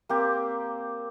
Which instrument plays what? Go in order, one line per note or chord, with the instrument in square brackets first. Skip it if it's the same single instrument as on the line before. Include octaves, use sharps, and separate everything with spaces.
[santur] A#3 C4 G4